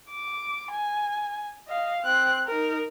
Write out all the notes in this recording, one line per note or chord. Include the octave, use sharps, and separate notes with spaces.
D6
G#5
D#5 F5
C4 F#6
D#4 A#4